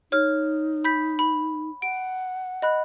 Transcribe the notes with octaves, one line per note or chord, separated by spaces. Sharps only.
D#4 C#5 F6
B5 G6 B6
B5
F#5 D7
D#5 B5 F#6